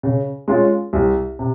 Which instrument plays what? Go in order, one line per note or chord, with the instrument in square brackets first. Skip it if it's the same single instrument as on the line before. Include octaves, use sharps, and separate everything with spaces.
[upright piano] C#3
G#3 C#4 F4
C2
C3